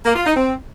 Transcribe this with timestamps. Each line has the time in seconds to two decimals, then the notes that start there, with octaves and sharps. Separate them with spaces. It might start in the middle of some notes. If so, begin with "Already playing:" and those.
0.05 A#3
0.15 F4
0.25 D#4
0.35 C4